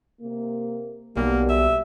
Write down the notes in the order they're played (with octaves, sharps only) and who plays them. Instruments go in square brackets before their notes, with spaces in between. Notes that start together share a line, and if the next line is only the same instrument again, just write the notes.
[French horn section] C3 A#3
[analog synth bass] B1 [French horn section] G3 B3 [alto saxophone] A#3
[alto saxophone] E5